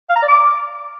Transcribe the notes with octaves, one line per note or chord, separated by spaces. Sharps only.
F5
A#5
D5
D6